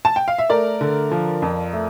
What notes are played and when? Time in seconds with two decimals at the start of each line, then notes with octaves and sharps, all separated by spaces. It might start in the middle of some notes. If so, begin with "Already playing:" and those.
0.05 A5
0.16 G5
0.28 F5
0.38 E5
0.50 A3 A#4 D5
0.81 D3
1.11 F3
1.42 F2
1.73 A3